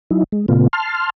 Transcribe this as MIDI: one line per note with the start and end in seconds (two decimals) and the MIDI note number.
0.11 0.24 54
0.11 0.24 63
0.11 0.24 64
0.32 0.46 56
0.48 0.68 46
0.48 0.68 49
0.48 0.68 57
0.48 0.68 59
0.48 0.68 65
0.73 1.10 81
0.73 1.10 84
0.73 1.10 89